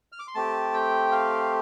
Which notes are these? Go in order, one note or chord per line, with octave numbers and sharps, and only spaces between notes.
F6
D6
C6
A3 C4 G4 A5
G5
F5